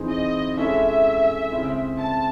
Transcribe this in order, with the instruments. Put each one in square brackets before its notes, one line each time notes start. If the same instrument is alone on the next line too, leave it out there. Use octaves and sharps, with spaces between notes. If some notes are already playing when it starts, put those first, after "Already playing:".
Already playing: [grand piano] E3 C4 D#4 G#4
[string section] D#5
[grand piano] G#3 C#4 E4 A4 [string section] E5
[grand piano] C#3 G#3 C4 E4
[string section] A5